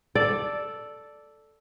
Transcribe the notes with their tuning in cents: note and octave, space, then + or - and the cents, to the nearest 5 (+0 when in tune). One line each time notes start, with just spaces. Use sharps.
A4 +0 D5 +0